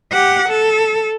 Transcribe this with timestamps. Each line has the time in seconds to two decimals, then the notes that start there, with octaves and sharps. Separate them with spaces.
0.12 G4 F#5
0.49 A4